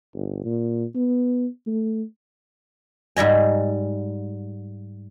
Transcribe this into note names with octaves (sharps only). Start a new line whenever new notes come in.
G1
A#2
B3
A3
G#2 G3 D#5 G#5